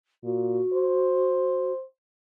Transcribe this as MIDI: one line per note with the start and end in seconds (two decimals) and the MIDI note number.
0.24 0.60 46
0.24 1.72 66
0.74 1.84 72